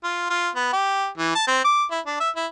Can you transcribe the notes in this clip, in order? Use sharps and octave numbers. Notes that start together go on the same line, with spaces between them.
F4
F4
B3
G4
E3
A5
C4
D6
E4
D4
E5
E4